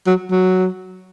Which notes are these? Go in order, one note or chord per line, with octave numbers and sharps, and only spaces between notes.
F#3
F#3